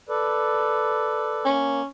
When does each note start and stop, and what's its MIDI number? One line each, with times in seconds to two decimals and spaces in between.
0.09 1.45 69
0.09 1.45 71
0.09 1.45 74
1.45 1.82 58
1.45 1.85 61